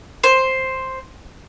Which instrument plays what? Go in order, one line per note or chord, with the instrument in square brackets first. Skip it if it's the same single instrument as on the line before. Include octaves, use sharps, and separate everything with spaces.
[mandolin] C5